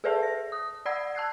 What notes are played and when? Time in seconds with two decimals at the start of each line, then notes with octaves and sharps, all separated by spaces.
0.04 G#4 A4 B4 D5 E5 A5
0.19 E5 A#6
0.52 D#6
0.86 D5 F#5 B5 E6 G#6 C7
1.15 A5 E6 F#6 G#6 C7